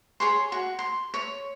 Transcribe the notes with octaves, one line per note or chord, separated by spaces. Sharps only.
G#4 C#5 C6
F#4
C6
C#5